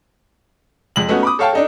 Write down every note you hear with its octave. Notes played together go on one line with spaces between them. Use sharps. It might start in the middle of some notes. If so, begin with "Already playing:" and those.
F2 G#3 F#7
A3 B3 C#4 D#4 F#4
B5 D6 D#6
A4 C#5 F5 G5 A5
D4 D#4 A4